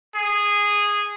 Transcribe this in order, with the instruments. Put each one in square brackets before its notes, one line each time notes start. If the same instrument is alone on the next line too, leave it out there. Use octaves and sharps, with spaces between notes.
[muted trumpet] G#4